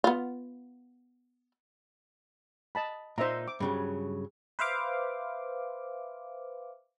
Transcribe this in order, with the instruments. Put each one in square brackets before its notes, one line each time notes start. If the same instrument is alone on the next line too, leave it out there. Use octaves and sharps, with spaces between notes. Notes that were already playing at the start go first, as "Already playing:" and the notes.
[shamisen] B3 F4
[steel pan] D#5 A5 B5
[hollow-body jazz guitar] A#2 D#4 [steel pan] C5 E5 A#5
[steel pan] D6
[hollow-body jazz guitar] G2 C#3 F#3
[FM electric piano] B4 C5 E5 F5 D6